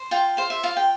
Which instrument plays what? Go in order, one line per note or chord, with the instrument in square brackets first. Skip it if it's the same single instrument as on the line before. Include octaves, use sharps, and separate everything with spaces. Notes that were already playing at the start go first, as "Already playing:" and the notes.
Already playing: [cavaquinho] C5
F4 G5
C5 F5
E5
F4 F5
G5